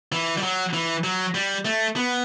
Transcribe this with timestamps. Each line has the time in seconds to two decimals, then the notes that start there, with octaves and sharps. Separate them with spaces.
0.12 E3
0.38 G3
0.43 F#3
0.74 E3
1.04 F#3
1.35 G3
1.65 A3
1.96 B3